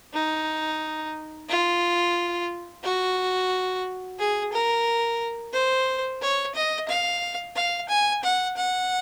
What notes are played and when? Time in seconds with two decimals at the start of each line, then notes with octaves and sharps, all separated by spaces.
0.13 D#4
1.49 F4
2.83 F#4
4.19 G#4
4.52 A#4
5.53 C5
6.21 C#5
6.55 D#5
6.88 F5
7.56 F5
7.89 G#5
8.23 F#5
8.56 F#5